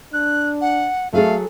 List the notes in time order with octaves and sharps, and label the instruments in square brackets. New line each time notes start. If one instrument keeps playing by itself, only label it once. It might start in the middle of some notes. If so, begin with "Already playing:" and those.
[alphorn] D4 [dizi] F#6
[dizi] F#5
[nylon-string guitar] F#3 G#4 A4 [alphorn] A3 [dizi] F5